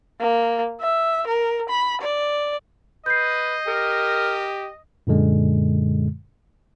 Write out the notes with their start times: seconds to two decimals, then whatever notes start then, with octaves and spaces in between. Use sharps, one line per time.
0.20 A#3
0.81 E5
1.27 A#4
1.69 B5
2.01 D5
3.06 B4 D#5 G6 C7
3.67 G4 A#4
5.07 F#2 A#2 D3 G#3